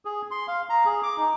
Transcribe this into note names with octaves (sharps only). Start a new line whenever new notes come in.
G#4
C6
F5
A#5
G#4
D6
D#4